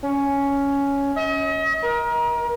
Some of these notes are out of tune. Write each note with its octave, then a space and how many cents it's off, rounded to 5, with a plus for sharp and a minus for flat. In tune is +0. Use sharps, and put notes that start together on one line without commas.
C#4 +10
D#5 +40
A#4 +30